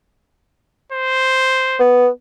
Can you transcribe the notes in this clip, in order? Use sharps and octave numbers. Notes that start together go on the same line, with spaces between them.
C5
B3